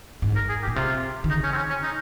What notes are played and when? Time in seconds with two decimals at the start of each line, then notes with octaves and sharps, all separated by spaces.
0.22 G#2
0.36 A#4
0.49 G#4
0.62 G4
0.67 A#2
0.76 C3 F4
1.24 D#3
1.29 C#3 D#4
1.43 C#4
1.52 C4
1.57 C#4
1.70 C#4
1.83 D#4